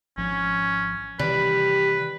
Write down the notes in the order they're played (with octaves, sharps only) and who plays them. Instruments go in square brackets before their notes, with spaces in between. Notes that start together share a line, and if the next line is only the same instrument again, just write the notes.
[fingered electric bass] G#1 F3 [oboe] C#4
[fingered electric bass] C3 D#3 E3 [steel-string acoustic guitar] G3 [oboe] B4